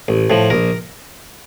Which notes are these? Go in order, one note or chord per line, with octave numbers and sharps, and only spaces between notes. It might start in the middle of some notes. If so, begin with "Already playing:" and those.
A1
A2 F3
A#1 A#4